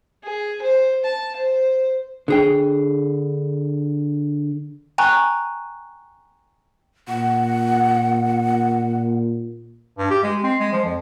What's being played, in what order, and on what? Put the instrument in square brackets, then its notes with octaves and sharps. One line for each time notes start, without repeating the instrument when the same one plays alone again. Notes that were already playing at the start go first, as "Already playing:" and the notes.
[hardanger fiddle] G#4
C5
A5
C5
[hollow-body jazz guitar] D3 G#4 G5
[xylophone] G5 G#5 A#5 C#6 F#6
[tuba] A#2 [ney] F#5
[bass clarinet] G2
G4
G#3
C4
G#3
F3
F2